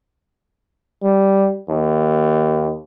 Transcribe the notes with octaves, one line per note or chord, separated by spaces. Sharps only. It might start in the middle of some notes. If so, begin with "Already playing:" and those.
G3
D#2